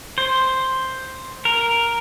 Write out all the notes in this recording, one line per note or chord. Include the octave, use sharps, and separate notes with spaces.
C5
A#4